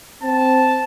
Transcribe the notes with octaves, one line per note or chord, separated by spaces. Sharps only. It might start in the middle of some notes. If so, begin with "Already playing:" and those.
C4 A5